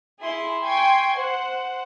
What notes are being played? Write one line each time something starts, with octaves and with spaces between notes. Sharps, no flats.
E4 G#4 C6
G5 G#5 C6 C#6 G#6
C5 F#5